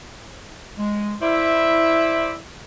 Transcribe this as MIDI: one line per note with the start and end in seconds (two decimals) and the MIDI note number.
0.78 1.16 56
1.22 2.38 64
1.22 2.32 72
1.22 2.32 74
1.22 2.32 76